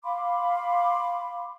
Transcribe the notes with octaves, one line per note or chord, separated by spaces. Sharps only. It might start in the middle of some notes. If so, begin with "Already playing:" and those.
F5 B5 C6 D6